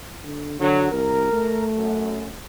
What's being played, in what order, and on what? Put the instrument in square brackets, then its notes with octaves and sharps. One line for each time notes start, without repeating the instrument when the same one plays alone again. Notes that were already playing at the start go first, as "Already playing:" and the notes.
[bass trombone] D3
[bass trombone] D3 [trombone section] F#3
[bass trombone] C2 [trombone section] A#4
[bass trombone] A3
[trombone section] F#2